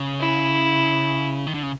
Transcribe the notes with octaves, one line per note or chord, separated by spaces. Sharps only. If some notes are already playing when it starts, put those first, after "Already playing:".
Already playing: C#3
E4
D#3
D3
C#3